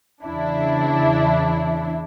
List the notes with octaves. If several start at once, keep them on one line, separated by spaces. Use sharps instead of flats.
E2 C#3 E3 D4 E4